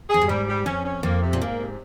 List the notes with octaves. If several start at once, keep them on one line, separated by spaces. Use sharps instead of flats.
F2 G#4
G2
G#2 G3
G3
F2 C#4
C#4
F2 A#3
C3
A#2
G#2 A#3
C3